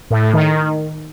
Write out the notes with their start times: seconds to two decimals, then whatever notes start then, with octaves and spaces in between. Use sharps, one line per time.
0.10 A2
0.22 A2
0.33 D#3